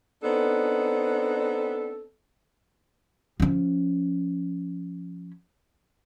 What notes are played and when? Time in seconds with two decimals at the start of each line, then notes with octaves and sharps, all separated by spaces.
0.23 B3 C4 D4 D#4 A4
3.40 F3 C#4